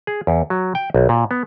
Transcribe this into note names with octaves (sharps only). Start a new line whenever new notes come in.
G#4
E2
F#3
G5
B1
A#2
B3